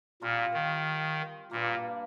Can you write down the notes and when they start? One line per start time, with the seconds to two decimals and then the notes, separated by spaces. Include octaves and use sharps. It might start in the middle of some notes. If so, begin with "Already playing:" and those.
0.21 A#2 G3 C4 F4 A#4
0.54 D#3
1.51 G2 A#2 G3 A#3